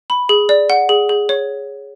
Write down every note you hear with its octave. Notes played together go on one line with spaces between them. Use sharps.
B5
G#4
D5
F#5
G#4
G#4
C#5